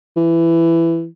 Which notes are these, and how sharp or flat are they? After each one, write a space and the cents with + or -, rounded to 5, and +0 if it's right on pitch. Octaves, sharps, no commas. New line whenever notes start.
E3 +15